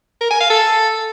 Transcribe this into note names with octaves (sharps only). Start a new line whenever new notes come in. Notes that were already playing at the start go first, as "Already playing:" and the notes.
A#4
G#5
F5
A4